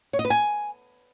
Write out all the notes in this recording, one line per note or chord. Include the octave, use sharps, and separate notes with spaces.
C#5
D#5
B4
G#5